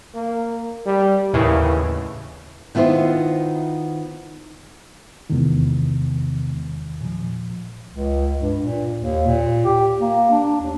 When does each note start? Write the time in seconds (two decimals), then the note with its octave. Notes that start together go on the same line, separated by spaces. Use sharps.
0.15 A#3
0.86 G3
1.33 D#2 A2 C#3 E3
2.75 D#3 B3 E4 F4 C5
5.30 E2 C3 D#3 G#3 B3
7.01 A#2 F3
7.92 C#2
8.39 G2
8.63 A#2
8.99 D#2
9.26 A#2
9.65 G4
10.01 A#3
10.31 D4
10.61 D#2